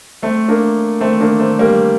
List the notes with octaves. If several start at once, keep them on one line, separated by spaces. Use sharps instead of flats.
A3 C4
A#3 D4
A3 C4
A#3 D4
A3 C4
G3 A#3